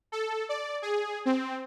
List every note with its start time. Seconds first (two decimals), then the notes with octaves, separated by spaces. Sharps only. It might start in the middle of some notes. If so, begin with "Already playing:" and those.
0.12 A4
0.49 D5
0.82 G#4
1.25 C4